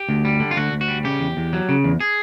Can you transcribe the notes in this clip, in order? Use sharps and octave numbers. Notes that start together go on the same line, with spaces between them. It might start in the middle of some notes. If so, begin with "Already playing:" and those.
Already playing: G4
D2
G3
D3
F4
D2 F#4
D2
F#4
G3
C#3 G4
E2
E2
F#3
C#3
E2
G#4